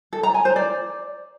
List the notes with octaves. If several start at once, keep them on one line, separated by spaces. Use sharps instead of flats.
A4
A#5
G#5
C5
D5